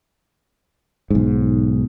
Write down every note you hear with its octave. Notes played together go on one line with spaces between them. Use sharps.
B1 G#2